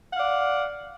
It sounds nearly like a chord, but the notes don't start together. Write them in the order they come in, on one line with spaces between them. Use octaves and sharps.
F#5 F5 D5